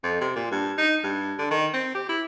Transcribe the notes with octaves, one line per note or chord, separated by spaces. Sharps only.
F2
C3
A#2
G2
D#4
G2
D3
D#3
C4
G4
E4